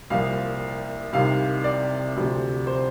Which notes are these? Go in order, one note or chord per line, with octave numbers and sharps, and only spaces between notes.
C2 A#2 F3 F5
C2 C3 D#3 F5
D5
D2 C3 F3
C5